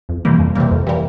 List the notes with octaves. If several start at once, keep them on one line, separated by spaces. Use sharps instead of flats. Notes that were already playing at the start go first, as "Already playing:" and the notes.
F2
C3 E3 G3 A#3
F2
C3 E3 G3 A#3
F2
C3 E3 G3 A#3